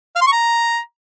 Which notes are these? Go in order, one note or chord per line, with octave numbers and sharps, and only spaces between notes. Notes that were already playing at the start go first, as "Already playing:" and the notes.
F5
C6
C#6
A#5